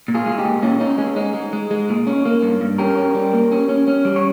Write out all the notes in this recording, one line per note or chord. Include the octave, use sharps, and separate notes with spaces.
A#2
F4 G#4
G#3 F4
D#4 G4
A#2
A#2 C#4 F4
C#4 D#4
G#3 C#4
G#3 D#4
G#3
G#3
G#3
A#2
C#4
A#3
G2
G2
C#4 G4 A#4
C#4
G3
A#3
C#4
C#4
C#4
G3
C#5